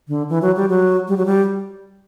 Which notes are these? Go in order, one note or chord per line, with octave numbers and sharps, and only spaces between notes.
D3
E3
F#3
G3
F#3
G3
F#3
G3